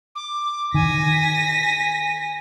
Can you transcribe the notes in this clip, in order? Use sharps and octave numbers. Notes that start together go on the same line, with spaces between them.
D6
D#3 G#5 A#6 B6